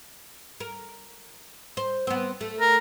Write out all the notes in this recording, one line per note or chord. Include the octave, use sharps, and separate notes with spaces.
A#4
C5
B3 C4
A3
A#4